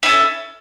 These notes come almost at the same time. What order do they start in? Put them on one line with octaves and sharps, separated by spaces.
E4 C#4 A4